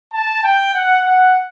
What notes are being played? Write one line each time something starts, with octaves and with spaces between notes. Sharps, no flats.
A5
G5
F#5
F#5